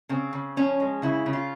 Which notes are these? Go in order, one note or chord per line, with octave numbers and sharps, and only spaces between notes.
C#3 C4
C#3
F3 C#4
G#3
C#3 E4
C#3
F4